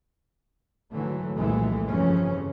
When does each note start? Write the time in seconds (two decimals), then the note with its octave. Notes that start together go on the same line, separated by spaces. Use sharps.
0.91 G#2 D3 E3 F#3 A3
1.35 C2 F2 A#2 E3 G#3 A3
1.84 G1 F2 C#3 E3 F3 C#4